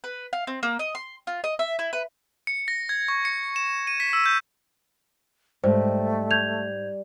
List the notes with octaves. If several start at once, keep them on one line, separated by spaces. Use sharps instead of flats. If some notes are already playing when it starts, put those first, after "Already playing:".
B4
F5
C4
A#3
D#5
C6
F4
D#5
E5
E4
B4
C#7
A#6
G#6
C#6
C#7
E7
D#7
B6
E6
G6
G#2 G3 A3 C5
G6 G#6 F7